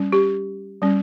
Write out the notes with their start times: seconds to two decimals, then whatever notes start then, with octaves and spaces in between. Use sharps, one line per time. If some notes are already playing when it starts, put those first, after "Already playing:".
Already playing: G3 C#4
0.12 G4
0.82 G3 C#4